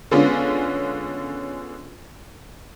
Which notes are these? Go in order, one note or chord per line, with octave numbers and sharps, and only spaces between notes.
D3 G#3 B3 C#4 D4 F4